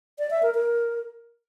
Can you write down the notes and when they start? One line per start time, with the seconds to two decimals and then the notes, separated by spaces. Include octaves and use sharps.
0.19 D5
0.31 E5
0.43 A#4
0.55 A#4